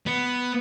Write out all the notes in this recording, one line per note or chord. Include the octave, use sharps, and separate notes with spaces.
B3